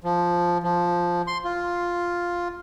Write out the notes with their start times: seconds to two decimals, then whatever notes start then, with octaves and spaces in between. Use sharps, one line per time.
0.04 F3
0.63 F3
1.27 C6
1.45 F4